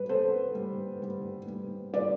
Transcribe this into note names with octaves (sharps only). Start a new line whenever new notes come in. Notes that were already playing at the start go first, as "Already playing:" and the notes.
Already playing: G3 B4
B3 A4 C5
G3
G3
G3
G3 B4 D5